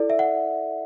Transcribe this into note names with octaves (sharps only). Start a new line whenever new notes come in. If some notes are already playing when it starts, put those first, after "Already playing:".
Already playing: E4 A4 D5
E5
F#5